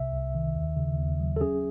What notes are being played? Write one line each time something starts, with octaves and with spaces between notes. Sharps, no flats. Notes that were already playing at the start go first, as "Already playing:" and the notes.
Already playing: C2 C3 E5
C2
D#3
D#2
C#3
D#2
F#3
A4
C#4 G#4